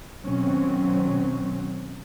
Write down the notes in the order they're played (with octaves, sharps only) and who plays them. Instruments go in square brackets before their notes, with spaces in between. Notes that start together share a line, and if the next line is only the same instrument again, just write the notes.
[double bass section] B2 D#3 F#3 C4 C#4